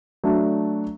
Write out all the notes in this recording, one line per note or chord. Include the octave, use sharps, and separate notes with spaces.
F#3 A3 D4